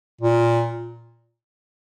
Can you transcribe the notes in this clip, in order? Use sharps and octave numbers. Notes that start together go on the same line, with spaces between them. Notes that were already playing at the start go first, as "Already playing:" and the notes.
A#2